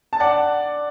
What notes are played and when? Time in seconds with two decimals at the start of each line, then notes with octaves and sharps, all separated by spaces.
0.13 A5
0.20 D5 F#5